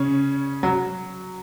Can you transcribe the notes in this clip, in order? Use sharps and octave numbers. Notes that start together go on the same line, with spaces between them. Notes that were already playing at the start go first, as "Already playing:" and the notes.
Already playing: C#3 C#4
F#3